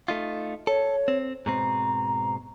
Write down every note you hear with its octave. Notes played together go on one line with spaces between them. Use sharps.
A3 D#4 F4
A4 C#5
C4
G#2 B2 C4 A#5